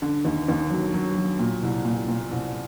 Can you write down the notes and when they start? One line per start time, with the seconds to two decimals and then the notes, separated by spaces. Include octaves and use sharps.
0.02 D3
0.25 D#2
0.48 D#2
0.70 F#3
0.94 F#3
1.16 F#3
1.39 A#2
1.63 C2
1.85 A#2
2.08 A#2
2.31 C2